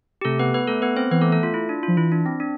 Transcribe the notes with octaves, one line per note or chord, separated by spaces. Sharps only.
G4
C3 A3 A4
B3 B4
B3 B4
A3 A4
B3 B4
C4 C5
E3 B3 B4
A3 A4
A3 A4
F4
E4
D4
F4
F3
E3 E4
D4
C4
D4